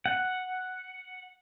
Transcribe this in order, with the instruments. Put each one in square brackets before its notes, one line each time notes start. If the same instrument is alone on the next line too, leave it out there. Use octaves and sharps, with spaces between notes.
[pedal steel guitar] F#5